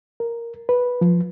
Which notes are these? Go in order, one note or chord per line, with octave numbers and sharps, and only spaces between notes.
A#4
B4
F3